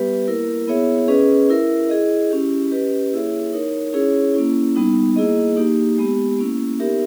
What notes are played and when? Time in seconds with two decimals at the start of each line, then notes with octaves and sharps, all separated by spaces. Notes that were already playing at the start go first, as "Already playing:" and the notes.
Already playing: G3 B3 G4 B4 E5
0.27 A#3 E4 A#4
0.68 B3 E4 G#4 C#5 E5
1.08 C#4 G#4 B4 D#5
1.50 E4 A#4 E5
1.89 E4 G#4 D#5
2.30 C#4 E4 G4
2.71 C#4 G4 B4 D#5
3.12 A#3 E4 G#4 C#5 E5
3.53 D#4 A#4 C#5
3.93 C#4 E4 G#4 C#5
4.34 A#3 C#4 E4
4.76 G3 B3 D#4
5.16 A#3 E4 G#4 D#5
5.57 A#3 D#4 G4
5.98 G#3 B3 G4
6.39 A#3 C#4 E4
6.80 B3 D#4 G4 A#4 E5